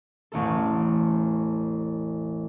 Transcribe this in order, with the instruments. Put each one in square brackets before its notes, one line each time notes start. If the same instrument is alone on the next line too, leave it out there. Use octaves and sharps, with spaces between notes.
[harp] E1 A1 A3 A4